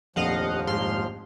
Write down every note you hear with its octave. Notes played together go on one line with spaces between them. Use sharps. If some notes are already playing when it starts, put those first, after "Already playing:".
F1 A#1 D#2 F3 D#5 F5 F#5
G#2 C6 F6